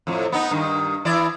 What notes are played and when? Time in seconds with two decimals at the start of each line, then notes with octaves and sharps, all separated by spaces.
0.07 F2 A2
0.32 B3 D#4
0.51 G2 D#3
1.05 E3 E4 D5